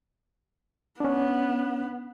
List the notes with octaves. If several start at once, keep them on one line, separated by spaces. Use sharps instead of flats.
B3 C#4 D4